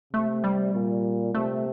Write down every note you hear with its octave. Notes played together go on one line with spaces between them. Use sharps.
C3 A3
G3
A#2
C3 A3